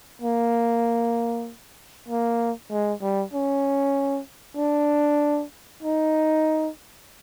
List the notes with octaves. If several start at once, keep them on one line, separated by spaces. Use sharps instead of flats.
A#3
A#3
G#3
G3
C#4
D4
D#4